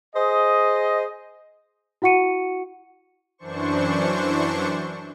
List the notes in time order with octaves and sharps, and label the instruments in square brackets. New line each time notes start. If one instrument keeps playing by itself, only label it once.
[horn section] G#4 C5 D#5
[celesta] E4 F#4 F#5 C#6 C#7 D#7
[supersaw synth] F#2 E3 D4 C5 C#6